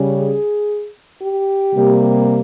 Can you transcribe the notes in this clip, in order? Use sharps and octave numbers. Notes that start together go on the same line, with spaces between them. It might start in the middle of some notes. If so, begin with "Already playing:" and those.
Already playing: C#3 G3 C#4
G#4
G4
C3 G3 A#3